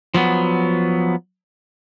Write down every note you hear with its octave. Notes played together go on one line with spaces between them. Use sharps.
F3 F#3 B3